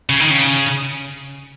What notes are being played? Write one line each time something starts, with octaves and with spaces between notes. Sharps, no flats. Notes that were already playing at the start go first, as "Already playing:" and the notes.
C#3
D#3
C#3